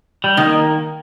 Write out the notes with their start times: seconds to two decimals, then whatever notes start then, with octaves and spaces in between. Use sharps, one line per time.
0.24 G3
0.37 D#3 A#3